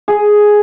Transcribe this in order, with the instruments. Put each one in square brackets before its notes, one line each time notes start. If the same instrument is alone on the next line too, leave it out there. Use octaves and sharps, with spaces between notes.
[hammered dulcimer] G#4